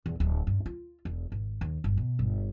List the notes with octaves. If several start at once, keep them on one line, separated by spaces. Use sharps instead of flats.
E2
D1
G2
F4
E1
G#1
D#2
G1
B2
G1